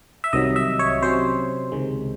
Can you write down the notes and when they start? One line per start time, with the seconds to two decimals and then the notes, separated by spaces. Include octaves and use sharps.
0.24 E5
0.33 C2 C3 D#3 F#3 D#5
0.56 E5
0.79 C#5
1.02 C3 F#3 C#4 C5
1.72 C#2 C3 D#3 G#3